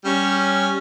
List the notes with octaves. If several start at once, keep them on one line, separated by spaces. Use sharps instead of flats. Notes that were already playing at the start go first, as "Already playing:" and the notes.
G3 C#4